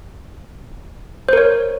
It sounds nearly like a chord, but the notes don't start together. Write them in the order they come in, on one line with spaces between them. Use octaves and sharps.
C5 A#4 C#5